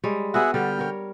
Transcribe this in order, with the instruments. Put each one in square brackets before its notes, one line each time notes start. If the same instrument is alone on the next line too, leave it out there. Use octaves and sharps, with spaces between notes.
[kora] G3 G#3 C#5
[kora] B3 F#4 [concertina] G#4 E5 F#5
[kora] D3 G3 [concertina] G5 F6
[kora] A#4 C#5